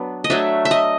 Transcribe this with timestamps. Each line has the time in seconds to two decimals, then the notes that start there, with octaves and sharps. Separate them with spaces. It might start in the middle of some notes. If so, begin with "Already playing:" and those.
Already playing: F#3 B3 D4
0.24 D#5
0.30 F#3 A3 D4 E5
0.65 E5
0.71 D#5